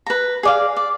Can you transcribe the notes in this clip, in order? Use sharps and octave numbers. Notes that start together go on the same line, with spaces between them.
B4 A#5
G#4 D5 F5
D5